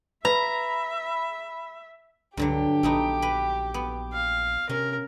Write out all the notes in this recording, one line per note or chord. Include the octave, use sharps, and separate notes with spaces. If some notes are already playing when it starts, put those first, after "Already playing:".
B4 E5 A#5 B5
C#2 G2 D3 F#3 G4
A#1 A3 B3 D#4
B4
B3
F5
C3 C#4 A#4